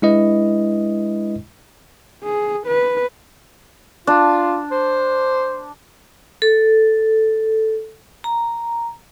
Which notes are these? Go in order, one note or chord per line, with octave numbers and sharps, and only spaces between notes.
G#3 D4 E4 B4 D#5
G#4
B4
D4 F4
C5
A4
A#5